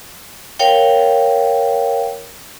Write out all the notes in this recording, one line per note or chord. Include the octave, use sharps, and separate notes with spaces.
A#4 C#5 F5 G5